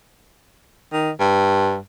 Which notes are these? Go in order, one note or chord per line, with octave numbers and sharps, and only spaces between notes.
D#3
G2